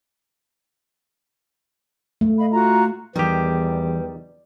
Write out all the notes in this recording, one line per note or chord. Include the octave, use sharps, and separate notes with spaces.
A3
D#5 F5 B5
F4 F#4 A#5
E2 D#3 E3 G3 G4